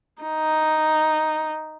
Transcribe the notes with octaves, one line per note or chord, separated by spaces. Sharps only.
D#4